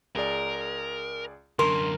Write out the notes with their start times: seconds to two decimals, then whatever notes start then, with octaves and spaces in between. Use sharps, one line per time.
0.16 C#2 G#4 A#4 D5
1.59 F#2 D3 A#4 C6